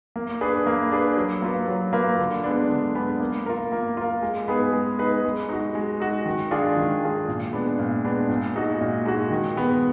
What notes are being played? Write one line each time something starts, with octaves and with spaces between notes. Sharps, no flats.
A#3
D4 G#4 B4
A#3
D4 G#4 B4
F#3
A#3 F4 B4
F#3
A#3 F4 B4
D3
G#3 B3 D4
D3
G#3 B3 D4
A#3
F4 A#4
A#3
F4 A#4
G#3
B3 D#4 G#4 B4
G#3
B3 D#4 G#4 B4
G#3
D#4 F#4
G#3
D#4 F#4
D#3
G#3 D4 F4 G#4
D#3
G#3 D4 F4 G#4
A#2
G#3 B3 D4
A#2
G#3 B3 D4
A#2
G#3 D#4 F#4
A#2
G#3 D#4 F#4
D#3
G#3 B3